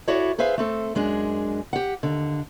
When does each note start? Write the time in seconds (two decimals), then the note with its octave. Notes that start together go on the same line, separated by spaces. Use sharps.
0.08 E4 F#4 A4 C#5 D5
0.38 G#4 B4 C5 E5 F5
0.58 A3 C4 A4
0.95 F#2 G#3 D4 G#4
1.73 G4 F#5
2.03 D#2 D3